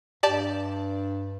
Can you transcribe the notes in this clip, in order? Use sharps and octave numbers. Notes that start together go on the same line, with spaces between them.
G2 G4 D5 A5